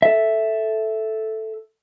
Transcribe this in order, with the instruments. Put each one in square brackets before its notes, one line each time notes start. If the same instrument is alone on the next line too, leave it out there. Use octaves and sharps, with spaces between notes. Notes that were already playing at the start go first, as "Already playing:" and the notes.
[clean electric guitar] A4 E5